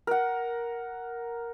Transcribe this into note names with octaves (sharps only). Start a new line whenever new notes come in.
A#4 F#5